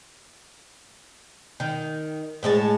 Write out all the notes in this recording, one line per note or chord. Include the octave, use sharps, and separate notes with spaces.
D#3
A2 G#3 C#5 A5